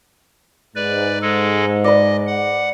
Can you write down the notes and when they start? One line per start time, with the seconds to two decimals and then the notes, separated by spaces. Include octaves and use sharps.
0.76 G#2 B4 D5
1.22 G#3 A4
1.84 B4 D5 D#5
2.27 F#5